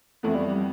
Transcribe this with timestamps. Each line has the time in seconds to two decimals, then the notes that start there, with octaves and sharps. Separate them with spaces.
0.23 F2 E3 A3 B3
0.35 G3
0.48 G3